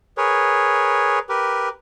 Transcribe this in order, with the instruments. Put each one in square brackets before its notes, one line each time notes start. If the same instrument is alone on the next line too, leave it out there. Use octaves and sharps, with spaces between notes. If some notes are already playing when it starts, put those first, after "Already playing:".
[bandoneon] G#4 A#4 B4 C#5
G4 A#4 B4